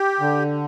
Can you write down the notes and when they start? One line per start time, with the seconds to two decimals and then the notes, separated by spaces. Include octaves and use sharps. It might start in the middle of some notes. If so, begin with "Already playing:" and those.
Already playing: G4
0.20 D3